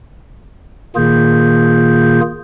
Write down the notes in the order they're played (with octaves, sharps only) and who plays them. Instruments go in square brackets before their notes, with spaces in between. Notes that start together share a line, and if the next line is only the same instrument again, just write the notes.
[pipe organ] A#2 D#3 A#3 F4 G#4 G6